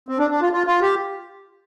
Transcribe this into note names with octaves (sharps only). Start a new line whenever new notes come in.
C4
D4
D4
F4
F4
F4
G4